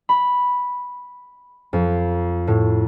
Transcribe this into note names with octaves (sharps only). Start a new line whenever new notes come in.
B5
F2
A2